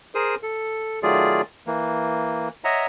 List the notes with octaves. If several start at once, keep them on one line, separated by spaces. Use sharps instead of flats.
G#4 A#4 C5 D#6
A4
D#3 F#3 A3 F4 G#4 D5
E3 A#3
C#5 D#5 E5 F#5 A#5